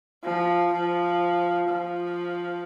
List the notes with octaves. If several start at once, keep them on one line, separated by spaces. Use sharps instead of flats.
F3
F3
F3